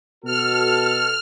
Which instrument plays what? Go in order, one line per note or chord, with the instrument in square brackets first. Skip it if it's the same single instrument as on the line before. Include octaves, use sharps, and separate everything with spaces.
[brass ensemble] B2 F#4 A4 [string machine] F6